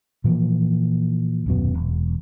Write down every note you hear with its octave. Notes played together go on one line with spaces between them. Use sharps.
A#2 E3 F3 A#3
D#1 F#2 B2
E1